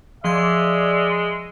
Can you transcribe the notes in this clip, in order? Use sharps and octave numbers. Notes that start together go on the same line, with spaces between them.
F3 G#3 D5 E5 C6 G#6